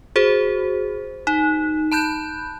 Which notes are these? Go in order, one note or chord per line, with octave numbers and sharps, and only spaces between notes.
F#4 G#4 C5
D#4
A5 B5 F#6 G6